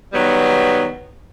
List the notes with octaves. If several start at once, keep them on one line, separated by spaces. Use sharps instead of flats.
D#3 F#3 G3 B3